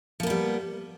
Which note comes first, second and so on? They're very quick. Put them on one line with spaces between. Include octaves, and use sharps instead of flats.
F3 A#3 B3 G3